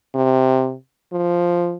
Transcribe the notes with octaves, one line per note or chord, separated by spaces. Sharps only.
C3
F3